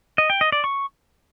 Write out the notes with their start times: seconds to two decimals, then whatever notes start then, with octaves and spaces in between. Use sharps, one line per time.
0.18 D#5
0.30 G5
0.41 D#5
0.52 D5
0.64 C#6